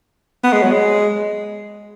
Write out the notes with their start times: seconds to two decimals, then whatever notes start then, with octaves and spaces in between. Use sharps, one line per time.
0.44 B3
0.52 G#3
0.63 F#3
0.72 G#3